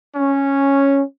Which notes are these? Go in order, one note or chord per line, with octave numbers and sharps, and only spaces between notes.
C#4